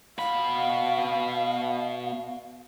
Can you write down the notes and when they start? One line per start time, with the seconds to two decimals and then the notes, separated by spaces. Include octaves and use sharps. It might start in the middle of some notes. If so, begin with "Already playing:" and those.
0.18 B2 F5 B5